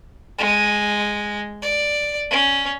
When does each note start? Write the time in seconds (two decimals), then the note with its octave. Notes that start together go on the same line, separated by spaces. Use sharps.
0.39 G#3
1.62 D5
2.30 C#4